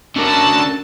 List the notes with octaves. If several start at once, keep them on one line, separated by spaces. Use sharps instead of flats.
D3 C#4 F#4 A#4 A5